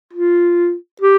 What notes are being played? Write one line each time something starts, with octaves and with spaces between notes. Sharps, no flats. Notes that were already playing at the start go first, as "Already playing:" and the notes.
F4
G4